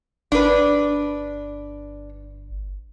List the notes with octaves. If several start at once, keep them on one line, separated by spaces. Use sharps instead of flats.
G1 D4 B4